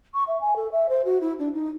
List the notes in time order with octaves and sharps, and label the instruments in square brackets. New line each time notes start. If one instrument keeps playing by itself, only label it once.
[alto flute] C#6
E5
G#5
A4
E5
C5
F#4
E4
D4
D#4